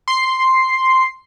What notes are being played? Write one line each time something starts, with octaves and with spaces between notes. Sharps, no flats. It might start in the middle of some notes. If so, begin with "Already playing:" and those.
C6 C7